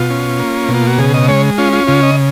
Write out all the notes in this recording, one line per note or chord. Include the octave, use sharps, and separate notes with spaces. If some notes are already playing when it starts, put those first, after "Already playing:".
Already playing: B2 F4
C#4
A#3
B2
F4
F#4
C#3 G#4
D#5
G#3 C#5
C#4 F4
F4
C#3 F4
D#5